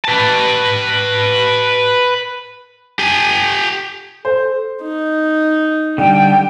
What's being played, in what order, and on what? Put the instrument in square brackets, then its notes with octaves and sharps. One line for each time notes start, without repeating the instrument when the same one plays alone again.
[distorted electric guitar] B4 A5
[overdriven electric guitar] G4 G#5
[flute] A4 [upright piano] C5
[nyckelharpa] D#4
[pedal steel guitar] D3 G3 [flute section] G5